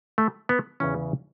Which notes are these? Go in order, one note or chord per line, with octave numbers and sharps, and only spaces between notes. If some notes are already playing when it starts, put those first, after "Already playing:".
A3
B3
E2 C#3 E3 C#4